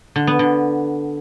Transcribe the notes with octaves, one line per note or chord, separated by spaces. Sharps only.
D3
B3
D3